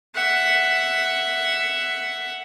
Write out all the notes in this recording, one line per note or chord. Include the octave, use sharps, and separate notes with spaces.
E5 F#5